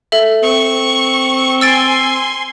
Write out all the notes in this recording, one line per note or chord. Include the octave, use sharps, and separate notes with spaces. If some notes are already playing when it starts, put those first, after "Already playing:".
A4 E5
C4 C#6
G#5 C6 E6 A6 D7